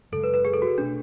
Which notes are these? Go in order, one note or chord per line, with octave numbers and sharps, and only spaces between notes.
F#2 C#3 G#3 A4
B4
B4
G#4
A4
F#4
B2 A3 C#4 D4